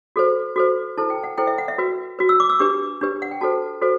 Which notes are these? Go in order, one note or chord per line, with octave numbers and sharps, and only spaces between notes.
F#4 A4 C5
F#4 A4 C5
E4 A4 C5 A5
G5
F#5
E4 A4 C5 G5
E5
F#5
E5
F#4 B4
F#4 B4
E6
D6
E6
D4 G4 B4 D6
D4 G4 B4
F#5
G5
F#4 A4 C5 A5
F#4 A4 C5